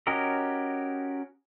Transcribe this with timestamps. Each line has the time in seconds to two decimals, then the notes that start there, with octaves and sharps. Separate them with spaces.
0.07 C#4 F#4 G4 A#4 D#5